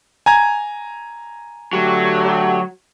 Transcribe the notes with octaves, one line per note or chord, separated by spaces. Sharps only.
G#5 A#5 G#6
D3 F#3 A3 G4